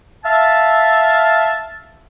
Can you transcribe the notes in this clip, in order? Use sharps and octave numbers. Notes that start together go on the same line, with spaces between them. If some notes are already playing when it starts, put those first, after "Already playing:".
E5 F5 A5